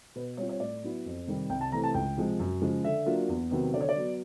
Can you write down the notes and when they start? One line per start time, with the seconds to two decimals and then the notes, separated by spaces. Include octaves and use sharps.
0.15 B2 B4
0.37 G3 C4 F4 C#5
0.49 C#5
0.60 A2 D5
0.83 F#3 B3 E4
1.06 F2
1.27 C3 D#3 G3
1.49 C2 G5
1.61 A5
1.72 C3 E3 A3 A#5
1.83 A5
1.94 C#2 G5
2.17 C3 F3 G#3
2.39 F#2
2.61 C#3 F3 G#3
2.84 D3 E5
3.06 F#3 A#3 D4 F4
3.29 E2
3.51 C3 D#3 F#3 B3
3.74 D3 D5
3.81 C#5
3.89 D5
3.96 F#3 B3